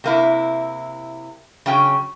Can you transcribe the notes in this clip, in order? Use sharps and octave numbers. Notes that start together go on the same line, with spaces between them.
C3 A#3 E4
C#3 F#3 C#4 G5